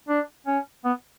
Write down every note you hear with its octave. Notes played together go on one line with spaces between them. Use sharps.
D4
C#4
B3